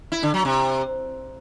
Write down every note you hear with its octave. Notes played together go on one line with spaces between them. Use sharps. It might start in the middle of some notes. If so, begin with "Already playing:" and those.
E4
D3
F#3
C3